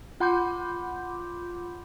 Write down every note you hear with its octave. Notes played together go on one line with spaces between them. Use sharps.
F4 F#5 B5 C6 D6 G6